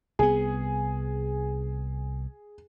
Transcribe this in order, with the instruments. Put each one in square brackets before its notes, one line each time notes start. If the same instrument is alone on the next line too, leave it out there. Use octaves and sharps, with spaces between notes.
[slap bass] C2 B3 [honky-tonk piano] G#4